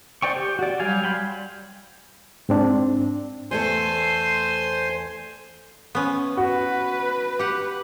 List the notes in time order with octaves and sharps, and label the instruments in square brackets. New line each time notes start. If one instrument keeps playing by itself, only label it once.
[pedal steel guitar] C5 D5 G5 C#6
G4
F#4 D5
F#3 G3 G4 F5 G#5
G5 B5 C6
[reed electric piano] G#2 C4 D4
[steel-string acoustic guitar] E2 A3 A4 [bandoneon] C5 G#5 C6
[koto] B3 C#4
[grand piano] F#4 [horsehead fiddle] B4
[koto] G4 F#5